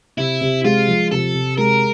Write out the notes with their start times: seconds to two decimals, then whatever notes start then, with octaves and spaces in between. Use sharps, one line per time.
0.18 C3 E4
0.41 C3
0.64 G#3 F4
0.88 F3
1.11 C3 A4
1.34 C3
1.58 G#3 A#4